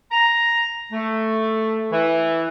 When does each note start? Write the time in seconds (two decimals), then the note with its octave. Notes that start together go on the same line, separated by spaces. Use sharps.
0.12 A#5
0.92 A3
1.92 E3